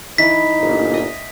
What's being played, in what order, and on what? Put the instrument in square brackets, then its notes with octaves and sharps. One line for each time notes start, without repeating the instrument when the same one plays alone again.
[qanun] E3 E4 [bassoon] D#4 [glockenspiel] B6
[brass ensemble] G1 A#2
[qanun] D#5 E5